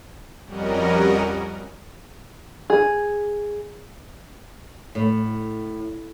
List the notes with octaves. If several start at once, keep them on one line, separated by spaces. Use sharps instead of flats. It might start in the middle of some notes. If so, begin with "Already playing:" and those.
F2 G3 C#4 F#4 A#4 D#5
G#4
A2